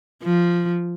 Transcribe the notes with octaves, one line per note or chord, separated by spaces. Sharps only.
F3